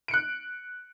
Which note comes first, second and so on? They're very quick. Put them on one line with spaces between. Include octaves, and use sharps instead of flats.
D7 C#7 F#6